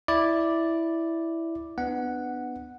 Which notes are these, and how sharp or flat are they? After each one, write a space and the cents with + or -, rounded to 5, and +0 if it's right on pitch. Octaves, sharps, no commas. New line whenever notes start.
E4 +0 D5 +0
B3 +10 D4 +25 F#5 +0